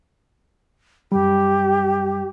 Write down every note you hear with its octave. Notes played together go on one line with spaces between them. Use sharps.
F#2 G3 G4